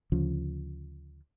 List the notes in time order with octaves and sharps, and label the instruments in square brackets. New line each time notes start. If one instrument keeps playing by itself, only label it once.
[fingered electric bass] D2 C#3 F3